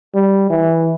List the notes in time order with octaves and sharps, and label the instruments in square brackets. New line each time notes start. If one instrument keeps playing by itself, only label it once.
[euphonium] G3
E3